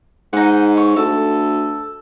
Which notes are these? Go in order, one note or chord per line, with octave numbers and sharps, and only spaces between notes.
G#2 D#4 F#5
C#5
D2 A4